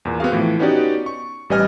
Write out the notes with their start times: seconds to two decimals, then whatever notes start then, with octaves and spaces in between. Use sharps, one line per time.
0.05 E2 A#2
0.20 B3 C4 F#4 G#4 F5
0.32 A2 E3 F3
0.59 B3 C#4 D#4 F#4 G4 D5
1.06 C#6
1.50 A1 G3 B4 D#5 G#5 F6